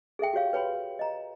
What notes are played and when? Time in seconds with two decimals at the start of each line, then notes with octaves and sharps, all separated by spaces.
0.19 G#4 A4 E5 G5
0.33 F#4 G4 C#5 F5
0.53 B4 C#5 G5 B5 C6
0.99 D#5 A#5